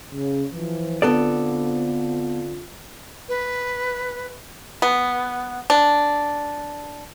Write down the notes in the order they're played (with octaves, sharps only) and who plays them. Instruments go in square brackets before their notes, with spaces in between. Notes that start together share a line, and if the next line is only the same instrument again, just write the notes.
[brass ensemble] C#3
E3 F3
[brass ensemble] D3 C4 F4 [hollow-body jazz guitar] B3 A4 D5
[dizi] B4
[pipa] B3
D4